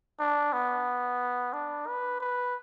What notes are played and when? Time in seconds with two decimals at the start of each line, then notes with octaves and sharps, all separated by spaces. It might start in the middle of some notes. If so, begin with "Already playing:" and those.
0.19 D4
0.52 B3
1.53 D4
1.87 B4
2.20 B4